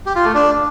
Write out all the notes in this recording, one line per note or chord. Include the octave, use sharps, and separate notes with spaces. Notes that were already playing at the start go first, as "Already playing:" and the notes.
G4
F4
A3
D4